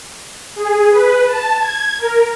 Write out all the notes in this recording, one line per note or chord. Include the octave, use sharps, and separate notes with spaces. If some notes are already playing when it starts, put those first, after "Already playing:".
G#4
B4
A5
G#6
A#4